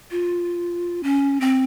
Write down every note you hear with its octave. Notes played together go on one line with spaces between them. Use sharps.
F4
C#4
C4